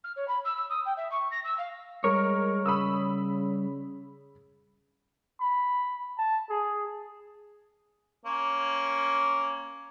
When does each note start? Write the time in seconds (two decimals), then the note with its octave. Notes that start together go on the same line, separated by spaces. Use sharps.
0.04 F6
0.16 C#5
0.28 B5
0.45 E6
0.57 E6
0.69 D#6
0.85 G5
0.97 E5
1.11 C#6
1.31 A#6
1.44 E6
1.58 F5
2.04 G3 G#3 A#4 C#5
2.66 C#3 B5 D#6 E6
5.40 B5
6.18 A5
6.50 G#4
8.26 A#3 C#4 C#5